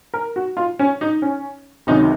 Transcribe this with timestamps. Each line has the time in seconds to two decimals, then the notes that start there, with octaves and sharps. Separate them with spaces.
0.14 A#4
0.36 F#4
0.57 F4
0.79 C#4
1.01 D#4
1.22 C#4
1.87 C#2 C3 D#3 F#3 D#4